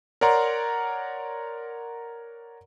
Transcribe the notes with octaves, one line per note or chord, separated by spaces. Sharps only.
A#4 C#5 D5 F#5 A#5 C6